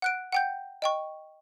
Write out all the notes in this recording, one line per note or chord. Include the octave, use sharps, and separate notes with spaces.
F#5 F#6 D7
F#5 G5 G6
D#5 G5 C#6